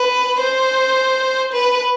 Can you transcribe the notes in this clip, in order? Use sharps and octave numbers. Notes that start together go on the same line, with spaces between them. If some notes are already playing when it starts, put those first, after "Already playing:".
Already playing: B4
C5
B4